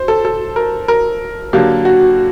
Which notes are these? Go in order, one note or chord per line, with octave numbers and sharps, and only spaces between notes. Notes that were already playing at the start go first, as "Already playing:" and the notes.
Already playing: C5
A4
A4
A#4
A#4
D3 F#3 A#3 G4
F#4